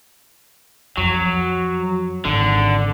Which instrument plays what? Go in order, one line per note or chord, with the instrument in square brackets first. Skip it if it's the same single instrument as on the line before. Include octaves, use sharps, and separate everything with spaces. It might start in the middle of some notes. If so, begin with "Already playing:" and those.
[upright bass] F2 [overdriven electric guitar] F#3
[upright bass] G#1 [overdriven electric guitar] D3